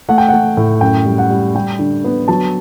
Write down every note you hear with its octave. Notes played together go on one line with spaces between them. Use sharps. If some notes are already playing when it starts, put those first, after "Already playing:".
A3 F#5
G5
A3 F#5
A2
F#2 G5
G3
F#5
G3
G3 G5
D3
B3
F#3 A5